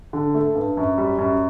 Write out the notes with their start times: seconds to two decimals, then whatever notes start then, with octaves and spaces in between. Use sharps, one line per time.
0.13 D3
0.34 A3
0.55 G2
0.77 F#2
0.98 G3
1.18 F#2